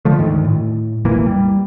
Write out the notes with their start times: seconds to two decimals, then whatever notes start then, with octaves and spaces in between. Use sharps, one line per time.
0.05 D3 F3 A3
0.19 D2 G#2 D#3
0.44 A2
1.05 E1 A#1 E3 A#3
1.26 G3